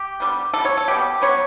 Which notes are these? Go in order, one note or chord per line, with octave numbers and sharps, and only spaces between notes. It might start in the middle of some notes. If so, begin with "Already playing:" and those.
Already playing: G4
D3 G3 B3
B2 G3 B3 A4
C#5
A4
B2 G3 B3 G4
D3 F#3 B3 C#5